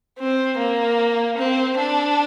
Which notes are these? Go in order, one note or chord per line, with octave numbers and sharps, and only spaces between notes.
C4
A#3
C4
D4